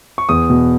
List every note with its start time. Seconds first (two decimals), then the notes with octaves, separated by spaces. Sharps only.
0.18 C#6
0.29 E2 D#6
0.50 B2